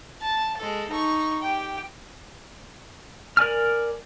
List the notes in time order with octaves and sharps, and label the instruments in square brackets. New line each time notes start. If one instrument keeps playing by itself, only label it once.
[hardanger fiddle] A5
G#3 A4
D#4 C#6
G4 G5
[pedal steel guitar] A#4 D5 G#5 F6